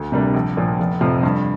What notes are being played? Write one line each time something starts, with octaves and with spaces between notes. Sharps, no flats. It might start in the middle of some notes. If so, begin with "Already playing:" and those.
Already playing: D2
C3 G3 A#3 D4
A#1
A#2 F3
F1
F2 C3 F3
G2